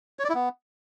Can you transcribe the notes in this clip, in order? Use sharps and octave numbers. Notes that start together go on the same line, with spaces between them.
C#5
D5
E4
B3